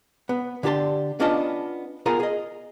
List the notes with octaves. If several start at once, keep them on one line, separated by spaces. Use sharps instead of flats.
B3
D3 D4 G4 G#4 A5 C6
B3 C#4 D4 F4 D#5 A5
B3 F4 G#4 A#4 G#5 A#5
G#4 D#5